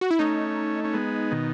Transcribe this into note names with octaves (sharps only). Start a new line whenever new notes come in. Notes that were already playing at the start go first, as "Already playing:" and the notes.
F#4
E4
A3 C#4 D#4
C#4
G#3 B3
B2 D#3